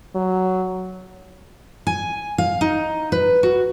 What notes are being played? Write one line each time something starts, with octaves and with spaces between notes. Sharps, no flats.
F#3
G#5
F5
D#4
B4
F#4